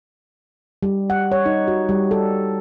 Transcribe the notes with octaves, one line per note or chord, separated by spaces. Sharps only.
G3
F#5
C#5
D#4
F#4
G3
A4